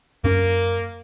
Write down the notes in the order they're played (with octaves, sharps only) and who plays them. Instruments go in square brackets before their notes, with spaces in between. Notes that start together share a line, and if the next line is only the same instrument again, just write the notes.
[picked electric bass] F#2 C#4 [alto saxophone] A#3